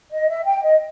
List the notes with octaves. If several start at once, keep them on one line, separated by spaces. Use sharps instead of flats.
D#5
E5
G5
D#5